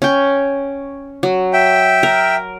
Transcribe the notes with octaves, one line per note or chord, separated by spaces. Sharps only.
C#4 G5
F#3
E5 G5
A#4